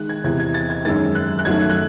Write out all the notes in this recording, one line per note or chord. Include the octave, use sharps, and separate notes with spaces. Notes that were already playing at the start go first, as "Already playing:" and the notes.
Already playing: D#3 G#3 F#6
G#6
E2 C3 E3 G#6
G#6
A6
G#6
F#2 D#3 G#3 A6
F#6
F#6
F#2 D#3 F#3 A3 G#6
F#6